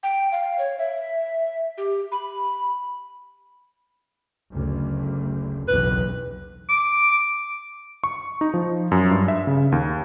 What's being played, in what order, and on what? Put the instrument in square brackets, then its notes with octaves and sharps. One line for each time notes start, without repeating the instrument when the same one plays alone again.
[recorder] G5
F5
C#5
E5
G4
B5
[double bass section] F#1 D2
[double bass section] F#1 B1 E2 [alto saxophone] B4
[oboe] D6
[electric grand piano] C#6
D#4
F3
F#2
G2
E5
C#3
D#2